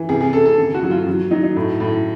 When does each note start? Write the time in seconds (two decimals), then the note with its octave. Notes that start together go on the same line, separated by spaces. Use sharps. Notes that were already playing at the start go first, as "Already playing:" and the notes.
Already playing: E3
0.09 C3 G#4
0.21 G#4
0.33 C3 A4
0.46 A4
0.58 D3
0.75 F#4
0.83 F#3
0.91 F4
1.06 F#3
1.31 F#3 D#4
1.44 D#4
1.56 A2
1.80 A2